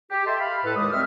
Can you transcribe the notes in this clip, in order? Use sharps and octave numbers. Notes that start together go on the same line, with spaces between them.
G4
A4 D#5 E5 A5 C6
F5 B5
A2 A4 B4
D#2 G#3 G4 D#6
G3 G#3 C4 E5 F6